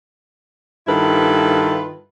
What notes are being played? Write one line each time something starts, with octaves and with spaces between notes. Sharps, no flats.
G2 D#3 E4 F4 A4 B4